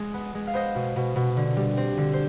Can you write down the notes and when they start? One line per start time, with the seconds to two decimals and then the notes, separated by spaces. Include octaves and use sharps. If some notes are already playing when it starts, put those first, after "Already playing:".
Already playing: G#3
0.14 B3
0.34 G#3
0.47 F5
0.53 B3 C5 D#5
0.75 B2
0.96 B2
1.16 B2
1.37 D3
1.56 G3
1.77 C4
1.98 D3
2.13 C5